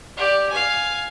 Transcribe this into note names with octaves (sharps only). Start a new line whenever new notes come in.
G4 D5
F5 G#5